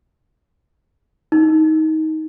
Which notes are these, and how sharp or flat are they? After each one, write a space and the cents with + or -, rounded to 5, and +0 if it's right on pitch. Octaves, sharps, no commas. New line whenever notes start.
D#4 +20